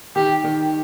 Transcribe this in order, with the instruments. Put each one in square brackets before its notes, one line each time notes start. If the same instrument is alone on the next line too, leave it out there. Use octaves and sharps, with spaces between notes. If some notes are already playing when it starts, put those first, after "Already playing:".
[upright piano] D#3 [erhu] G4
[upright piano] D#3